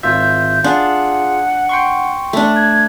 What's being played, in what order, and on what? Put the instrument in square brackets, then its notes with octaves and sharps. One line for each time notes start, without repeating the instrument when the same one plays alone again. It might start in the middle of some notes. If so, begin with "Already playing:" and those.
[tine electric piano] G#1 F4 E5 [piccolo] G6
[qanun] D4 [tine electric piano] F4 G#4 [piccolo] F#5
[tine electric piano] G5 C6 C#6
[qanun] A3 D4
[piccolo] G#6